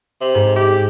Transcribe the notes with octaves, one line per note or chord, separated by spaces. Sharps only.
C3
G#2
G4